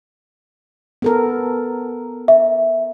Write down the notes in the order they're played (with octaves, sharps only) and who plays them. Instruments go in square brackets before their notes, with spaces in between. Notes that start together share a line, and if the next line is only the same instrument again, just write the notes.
[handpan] B3 A4 A#4
[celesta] E5